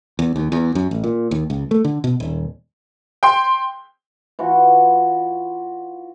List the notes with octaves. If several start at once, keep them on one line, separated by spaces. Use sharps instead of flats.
E2
D#2
E2
F#2
A1
A#2
D#2
C#2
A3
D3
B2
D#1
G5 C6
E3 F4 F#4 C#6